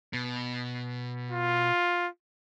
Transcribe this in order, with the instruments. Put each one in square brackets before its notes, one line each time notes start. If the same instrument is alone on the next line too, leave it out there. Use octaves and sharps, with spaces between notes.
[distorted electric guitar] B2
[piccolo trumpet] F4